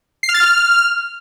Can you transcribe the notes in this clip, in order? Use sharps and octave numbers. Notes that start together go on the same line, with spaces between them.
C7
F6
A6
F6